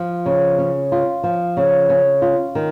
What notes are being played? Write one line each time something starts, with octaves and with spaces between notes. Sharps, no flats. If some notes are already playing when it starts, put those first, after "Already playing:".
Already playing: F3
C#3
C#4
F4
F3
C#3
C#4
F4
D#3